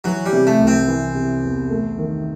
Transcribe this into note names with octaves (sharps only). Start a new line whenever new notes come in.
E3 F#3
G3
C3
A3
C2
C4
E3
C3
E2
A3
D#3